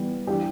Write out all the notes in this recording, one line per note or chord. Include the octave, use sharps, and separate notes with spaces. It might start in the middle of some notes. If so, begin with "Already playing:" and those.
Already playing: E3 G3 B3
E3 G3 D4 G4